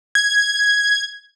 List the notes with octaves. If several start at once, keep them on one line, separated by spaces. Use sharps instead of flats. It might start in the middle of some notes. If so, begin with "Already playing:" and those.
G#6